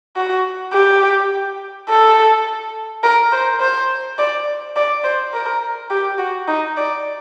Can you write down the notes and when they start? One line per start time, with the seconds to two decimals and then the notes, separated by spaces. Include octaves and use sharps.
0.17 F#4
0.73 G4
1.89 A4
3.04 A#4
3.32 C5
3.60 C5
4.18 D5
4.76 D5
5.04 C5
5.34 A#4
5.90 G4
6.19 F#4
6.48 D#4
6.77 D5